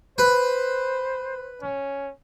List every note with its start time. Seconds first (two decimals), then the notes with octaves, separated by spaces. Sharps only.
0.18 B4 C5
1.61 C#4